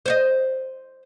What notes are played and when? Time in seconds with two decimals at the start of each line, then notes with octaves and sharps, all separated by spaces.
0.06 C5 C#5 D#5